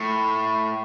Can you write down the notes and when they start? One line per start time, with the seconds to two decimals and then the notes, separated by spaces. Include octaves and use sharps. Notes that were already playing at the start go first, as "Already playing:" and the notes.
Already playing: A2